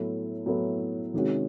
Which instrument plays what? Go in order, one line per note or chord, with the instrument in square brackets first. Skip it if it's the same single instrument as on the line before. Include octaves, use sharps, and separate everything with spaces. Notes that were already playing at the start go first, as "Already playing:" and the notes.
Already playing: [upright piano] A2 F#3 B3 E4 A4
A2 F#3 B3 E4 A4
C3 D#3 G#3 C#4 F#4